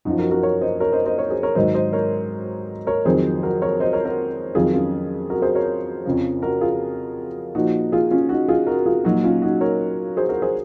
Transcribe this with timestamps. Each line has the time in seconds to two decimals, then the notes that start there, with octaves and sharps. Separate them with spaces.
0.05 F#2 F3 D#4 F#4
0.19 F#4 A#4
0.31 F#4 A#4
0.43 A#4 C#5
0.61 C5 D#5
0.80 A#4 C#5
0.93 C5 D#5
1.05 C5 D#5
1.18 A#4 C#5
1.30 G#4 C5
1.43 A#4 C#5
1.55 G#2 D#3 F#3 C5 D#5
1.74 C5 D#5
1.93 A#4 C#5
2.87 A#4 C#5
3.05 F2 D#3 F#3 G#4 C5
3.43 F#4 A#4
3.62 A#4 C#5
3.80 C5 D#5
3.93 A#4 C#5
4.05 F#4 A#4
4.55 F2 D#3 F#3 F4 G#4
4.73 C#4 F4
5.30 F#4 A#4
5.42 G#4 C5
5.55 A#4 C#5
6.05 F2 C#3 F3
6.42 F#4 A#4
6.61 F4 G#4
7.55 A#2 F3 D#4 F#4
7.92 F4 G#4
8.11 C#4 F4
8.29 D#4 F#4
8.48 F4 G#4
8.67 F#4 A#4
8.86 F4 G#4
9.04 A#2 F#3 D#4 F#4
9.24 C#4 F4
9.42 D#4 F#4
9.61 A#4 C#5
10.17 G#4 C5
10.29 F#4 A#4
10.42 G#4 C5